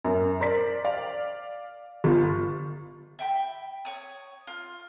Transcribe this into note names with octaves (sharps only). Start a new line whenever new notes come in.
F#2
A#4 C5 D5 B6
D5 F5
G1 F4
E5 G5 B5
C#5 D#6
F4